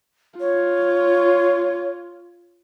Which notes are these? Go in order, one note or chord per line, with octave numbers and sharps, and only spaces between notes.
F4 C#5